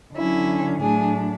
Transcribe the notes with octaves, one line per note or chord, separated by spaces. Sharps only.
D3 F#3 C#4 E4
A2 F#3 A3 D4 G#4